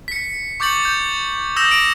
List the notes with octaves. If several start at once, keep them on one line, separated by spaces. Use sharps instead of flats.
B6 C#7
C#6 D6 G6 A6 C#7 F#7
G6
D#6 E6 G6 A#6 E7
D7